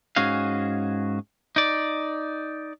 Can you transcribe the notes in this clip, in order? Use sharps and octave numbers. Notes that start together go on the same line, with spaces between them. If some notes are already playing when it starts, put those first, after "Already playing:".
G#2 C#4 F#4 G#4 F5
D#4 D5